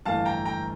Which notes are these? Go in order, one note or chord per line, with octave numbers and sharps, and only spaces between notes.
G1 F2 E3 A3 F5 A5
G5 A#5
G5 A#5